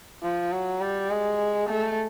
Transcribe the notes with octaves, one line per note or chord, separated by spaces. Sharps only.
F3
F#3
G3
G#3
A3